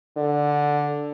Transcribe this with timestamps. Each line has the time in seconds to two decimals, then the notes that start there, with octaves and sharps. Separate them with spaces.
0.17 D3